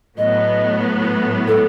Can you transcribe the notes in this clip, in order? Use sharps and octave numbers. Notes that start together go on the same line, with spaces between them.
A2 F#3 B3 D#5
A4